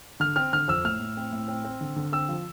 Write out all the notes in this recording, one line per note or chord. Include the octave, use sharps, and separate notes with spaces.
D3 F6
C4 F6
D3 F6
F2 E6
A2 F6
A2
C4
A2
C4
C4
D3
D3
C4 E6
F3